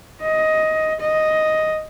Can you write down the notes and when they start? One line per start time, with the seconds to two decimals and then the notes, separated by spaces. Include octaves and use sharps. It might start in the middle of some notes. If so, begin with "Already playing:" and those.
0.22 D#5
1.01 D#5